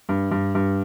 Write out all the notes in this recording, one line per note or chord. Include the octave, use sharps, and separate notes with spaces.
G2
G2
G2